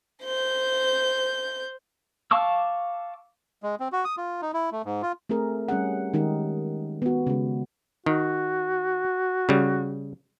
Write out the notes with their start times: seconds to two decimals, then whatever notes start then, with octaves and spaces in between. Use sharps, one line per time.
0.23 C5 G6
2.31 F5 A5 C#6 D6 E6
3.63 G#3
3.80 C4
3.92 F#4
4.05 D#6
4.17 F4
4.42 D#4
4.54 E4
4.72 A3
4.85 G#2
5.02 F4
5.29 A3 C4 G#4 A#4
5.68 G3 C#4 G#4 F#5
6.14 D#3 G#3 D#4 G4 A#4
7.02 B3 F#4
7.27 C#3 G#3
8.06 D#3 F#4
9.49 C#3 G3